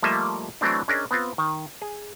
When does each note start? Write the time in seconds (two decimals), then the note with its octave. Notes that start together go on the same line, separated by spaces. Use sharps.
0.03 F3 G3 A3 A#3 D#5 E5
0.61 E3 F#3 A3 C4 D4
0.88 C#4 D4 G#4 A#4 D5 D#5
1.11 B3 C4 F4
1.38 D#3
1.82 G#4